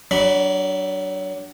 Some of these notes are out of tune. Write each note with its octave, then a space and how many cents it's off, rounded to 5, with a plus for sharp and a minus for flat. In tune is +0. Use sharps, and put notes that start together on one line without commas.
F#3 +25 D4 -10 B5 -5